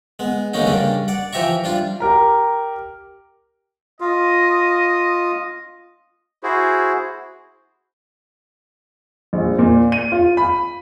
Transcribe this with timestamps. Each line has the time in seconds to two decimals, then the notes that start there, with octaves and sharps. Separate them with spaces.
0.19 G#3 B3
0.54 D#2 D3 G#3 A#3 C#4 D#4
0.66 G2 C#3 G3 A#3 D4
1.08 D5 F#5
1.33 E3 F3 G4 E5 A#5 C#6
1.64 G3 D4 F4
2.00 G4 A#4 A#5
4.00 F4 D#5
6.43 E4 F#4 G#4 C5
9.33 A#1
9.59 A#2
9.92 D#7
10.12 F4
10.37 B5